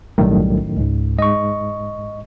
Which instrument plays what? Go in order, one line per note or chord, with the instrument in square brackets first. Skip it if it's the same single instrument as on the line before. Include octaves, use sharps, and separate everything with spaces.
[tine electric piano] B1 G3 [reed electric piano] F#2 A2 D#3
[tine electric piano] C#2 G#2
[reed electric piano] G#2 [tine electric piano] D#5 C#6